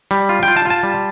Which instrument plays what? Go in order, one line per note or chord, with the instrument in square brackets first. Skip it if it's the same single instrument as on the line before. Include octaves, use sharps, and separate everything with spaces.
[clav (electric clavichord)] G3
F4
G5
F4
A5
F4
A5
G3